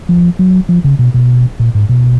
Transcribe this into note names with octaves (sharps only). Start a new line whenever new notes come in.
F3
F#3
F3
C#3
B2
B2
A#2
G#2
B2